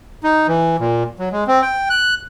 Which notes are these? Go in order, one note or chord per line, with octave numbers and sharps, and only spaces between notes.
D#4
E3
A#2
F#3
G#3
C4
G5
F#6